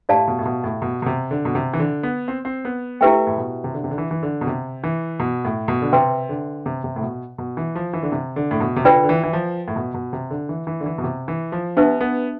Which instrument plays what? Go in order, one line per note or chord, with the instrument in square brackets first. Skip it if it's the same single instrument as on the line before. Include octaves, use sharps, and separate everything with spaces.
[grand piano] A2 [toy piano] G4 D5 F5 A5
[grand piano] B2
A2
B2
A2
B2
B2
C3
D3
B2
C3
E3
D3
B3
C4
C4
B3
[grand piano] A3 [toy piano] E4 G4 B4 E5 G5
[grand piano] A2
B2
C3
D3
C3
D3
E3
E3
D3
B2
C3
E3
B2
A2
B2
D3
[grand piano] C3 [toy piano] B4 E5 G5 C6
[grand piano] D3
C3
C3
A2
B2
B2
E3
F3
E3
D3
C3
D3
A2
B2
C3
[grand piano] D3 [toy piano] F4 B4 D5 G5
[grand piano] D3
E3
E3
F3
A2
B2
B2
C3
D3
E3
E3
D3
E3
B2
C3
E3
F3
[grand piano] B3 [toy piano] D4 G4 B4 E5 A5
[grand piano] B3